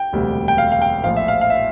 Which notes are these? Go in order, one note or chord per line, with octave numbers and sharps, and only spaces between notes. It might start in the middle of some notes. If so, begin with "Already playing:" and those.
Already playing: G5
E1 D2 C3 G3
G5
F5
F5
G5
A#1 A2 F3 F5
E5
F5
F5
E5